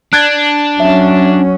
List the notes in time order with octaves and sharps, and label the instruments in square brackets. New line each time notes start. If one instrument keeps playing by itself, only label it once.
[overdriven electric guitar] D4 [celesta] F#6 G#6 A6
[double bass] F#3 C#4 [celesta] E5